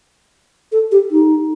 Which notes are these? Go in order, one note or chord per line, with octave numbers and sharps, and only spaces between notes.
A4
G4
D#4